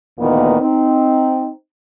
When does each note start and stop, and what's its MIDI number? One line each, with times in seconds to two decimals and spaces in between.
0.18 0.55 38
0.18 0.55 46
0.18 0.55 51
0.18 0.55 52
0.18 0.55 58
0.18 0.55 59
0.60 1.49 60
0.60 1.49 63